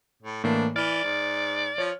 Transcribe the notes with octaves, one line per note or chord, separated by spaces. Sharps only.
A2
A2 E3 A#3 D4
E3 D5 F6
G#2
F3 C#5